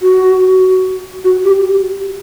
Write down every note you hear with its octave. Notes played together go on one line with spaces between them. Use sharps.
F#4
F#4
G4